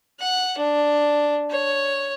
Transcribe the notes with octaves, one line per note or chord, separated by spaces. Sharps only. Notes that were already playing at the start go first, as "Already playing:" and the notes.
F#5
D4
C#5